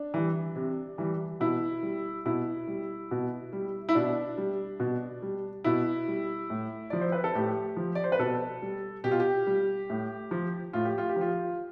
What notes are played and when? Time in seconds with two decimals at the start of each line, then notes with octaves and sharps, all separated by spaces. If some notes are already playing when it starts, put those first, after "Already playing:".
Already playing: D4
0.14 E3 G3
0.56 C3
0.98 E3 G3
1.40 B2 E4
1.83 G3
2.25 B2 E4
2.68 G3
3.11 B2
3.53 G3
3.89 E4
3.95 B2 D4
4.38 G3
4.80 B2
5.22 G3
5.64 B2 E4
6.08 G3
6.50 A2
6.90 F3 D5
7.01 C5
7.12 B4
7.24 A4
7.35 A2 G4
7.77 F3
7.95 D5
8.04 C5
8.12 B4
8.19 B2 A4
8.62 G3
9.04 B2 G4
9.11 F4
9.20 G4
9.47 G3
9.90 A2
10.31 F3
10.73 A2 F4
10.85 G4
10.98 F4
11.09 G4
11.16 F3
11.21 F4